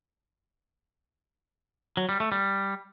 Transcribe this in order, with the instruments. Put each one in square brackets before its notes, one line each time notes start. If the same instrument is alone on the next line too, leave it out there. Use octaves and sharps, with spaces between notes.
[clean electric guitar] F#3
G3
A3
G3